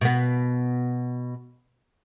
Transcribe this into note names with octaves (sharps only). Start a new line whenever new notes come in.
B2 B3